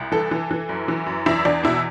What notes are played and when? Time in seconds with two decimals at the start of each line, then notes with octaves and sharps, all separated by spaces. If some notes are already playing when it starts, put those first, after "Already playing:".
Already playing: C2
0.12 E3 A4
0.31 E3
0.51 E3
0.69 F#2
0.88 E3
1.06 F#2
1.26 E2 E4
1.45 E2 D4
1.63 B2 E4